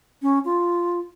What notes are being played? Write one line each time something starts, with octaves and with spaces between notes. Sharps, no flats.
C#4
F4